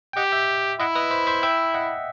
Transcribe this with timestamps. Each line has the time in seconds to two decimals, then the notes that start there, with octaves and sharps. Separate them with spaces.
0.13 G5
0.17 G4 D#5 F#5
0.32 E5 G5
0.80 E4 D#5 F#5
0.95 B4 D#5
1.11 C5 E5
1.27 C5 E5
1.43 E5 G5
1.74 D#5 F#5